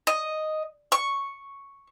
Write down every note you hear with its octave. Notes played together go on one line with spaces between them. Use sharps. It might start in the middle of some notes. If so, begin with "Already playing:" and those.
D#5
C#6